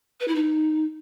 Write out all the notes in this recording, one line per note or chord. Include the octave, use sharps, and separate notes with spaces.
B4
E4
D#4